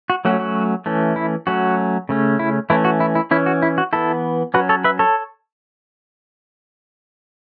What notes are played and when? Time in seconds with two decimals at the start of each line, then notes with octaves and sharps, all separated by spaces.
0.10 F#4
0.25 F#3 A3 C#4 F#4
0.40 F#4
0.86 E3 A3 C#4
1.16 E4
1.47 F#3 A3 C#4 F#4
2.09 C#3 A3 C#4
2.39 E4
2.70 E3 A3 C#4 E4
2.85 F#4
3.00 E4
3.15 E4
3.31 E3 C#4 E4
3.46 F#4
3.62 E4
3.78 F#4
3.93 E3 B3 E4 A4
4.54 F#3 C#4 F#4 B4
4.69 A4 C#5
4.84 B4 E5
4.99 A4 C#5